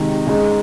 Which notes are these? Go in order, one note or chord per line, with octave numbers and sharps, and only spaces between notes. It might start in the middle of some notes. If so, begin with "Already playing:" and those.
Already playing: C3 D#3 G#3 D#4 G4
C#3 G#3 D#4